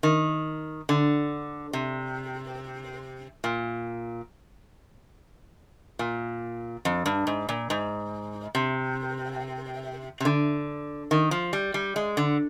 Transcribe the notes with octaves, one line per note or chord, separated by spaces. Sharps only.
D#3
D3
C3
A#2
A#2
F2
G2
G#2
A#2
G#2
C3
C3
D3
D#3
F3
G3
G3
G#3
D3